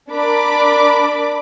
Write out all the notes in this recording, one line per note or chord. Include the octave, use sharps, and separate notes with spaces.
D4 A#4 B5 D6